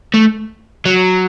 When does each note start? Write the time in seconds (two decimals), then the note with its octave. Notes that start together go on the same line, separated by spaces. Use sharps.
0.14 A3
0.86 F#3